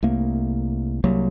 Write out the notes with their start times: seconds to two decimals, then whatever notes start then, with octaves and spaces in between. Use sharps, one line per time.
0.03 C2 A3 A#3
1.04 C2 F#3 A#3